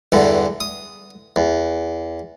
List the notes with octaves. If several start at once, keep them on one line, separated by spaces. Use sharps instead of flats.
E2 G2 D3
D#6
E2